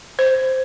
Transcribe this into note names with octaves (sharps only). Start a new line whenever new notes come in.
C5